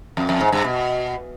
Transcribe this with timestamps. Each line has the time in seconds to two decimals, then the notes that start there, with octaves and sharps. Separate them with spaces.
0.17 F2
0.29 F2
0.41 G#2
0.52 G2
0.64 B2